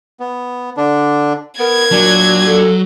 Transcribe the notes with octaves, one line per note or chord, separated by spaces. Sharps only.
B3
D3 D4
B3 A#4 G#6
A#2 F#3 D4
A4